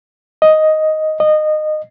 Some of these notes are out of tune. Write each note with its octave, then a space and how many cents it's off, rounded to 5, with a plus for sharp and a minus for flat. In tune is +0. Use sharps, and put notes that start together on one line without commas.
D#5 +5
D#5 -20